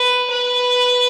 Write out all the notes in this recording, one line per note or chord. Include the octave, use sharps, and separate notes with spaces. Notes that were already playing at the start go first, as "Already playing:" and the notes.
Already playing: B4
B4